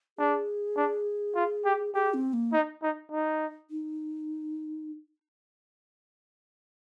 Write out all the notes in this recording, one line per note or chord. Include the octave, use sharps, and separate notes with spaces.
D4 G#4
D4
F4
G4
G4 G#4
C4
A#3
D#4
D#4
D#4
D#4